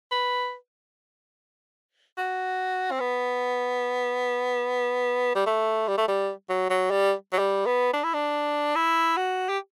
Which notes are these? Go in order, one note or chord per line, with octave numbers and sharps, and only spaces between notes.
B4
F#4
C4
B3
G3
A3
G3
A3
G3
F#3
F#3
G3
F#3
G3
B3
D4
E4
D4
E4
F#4
G4